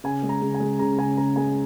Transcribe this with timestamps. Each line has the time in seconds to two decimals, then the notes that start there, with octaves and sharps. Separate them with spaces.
0.04 C#3 G#5
0.23 G#3
0.29 A#5
0.42 C#3
0.54 G#5
0.60 G#3
0.79 C#3 A#5
0.98 C#3 G#5
1.17 C#3 A#5
1.36 G#3 G#5